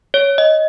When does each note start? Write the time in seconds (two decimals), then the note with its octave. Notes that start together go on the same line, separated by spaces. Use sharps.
0.14 C#5
0.38 D#5